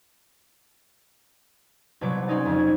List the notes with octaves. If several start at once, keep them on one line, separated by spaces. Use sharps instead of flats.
C2 B2 F#3 C#5 D6
C4 C#4 D#4 D5
F2 C#3 C#4
G#6